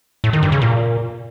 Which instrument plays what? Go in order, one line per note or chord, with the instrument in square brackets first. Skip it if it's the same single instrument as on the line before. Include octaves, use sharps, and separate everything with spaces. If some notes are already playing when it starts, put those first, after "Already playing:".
[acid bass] A2
D#3
G2
C#3
A#2